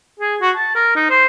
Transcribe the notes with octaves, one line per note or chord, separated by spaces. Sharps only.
G#4
F#4
A5
A#4
D#4
C5